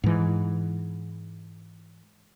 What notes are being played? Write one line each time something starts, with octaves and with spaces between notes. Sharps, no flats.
G#2 E3